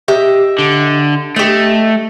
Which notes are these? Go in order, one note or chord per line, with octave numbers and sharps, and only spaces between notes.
G4 D#5 E5
D3
A3 G4 D#5